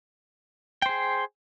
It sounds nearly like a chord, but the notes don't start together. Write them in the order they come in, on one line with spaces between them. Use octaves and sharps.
G5 C5 G#4